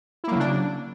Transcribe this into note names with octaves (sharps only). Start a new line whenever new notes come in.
C#3 F#3 A#3 D4 E4